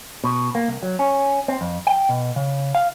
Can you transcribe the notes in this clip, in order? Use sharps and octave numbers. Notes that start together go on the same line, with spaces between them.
B2
A#3
C2
F#3
C#4
C4
F2
G5
B2
C#3
F5